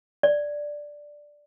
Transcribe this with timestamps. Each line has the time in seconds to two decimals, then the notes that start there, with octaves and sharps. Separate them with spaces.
0.23 D5